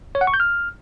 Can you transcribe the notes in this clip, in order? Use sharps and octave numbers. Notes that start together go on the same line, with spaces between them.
C#5
F#5
C#6
G6
F6